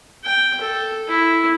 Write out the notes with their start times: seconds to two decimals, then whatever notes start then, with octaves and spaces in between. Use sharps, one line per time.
0.24 G5
0.61 A4
1.08 E4